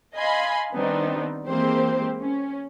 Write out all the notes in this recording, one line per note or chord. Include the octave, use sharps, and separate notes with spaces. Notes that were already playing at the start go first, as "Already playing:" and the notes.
D#5 F5 G#5 B5 C6
D#3 G3 B3 C4 D4 D#4
E3 G#3 A#3 C4 G4 C5
C#4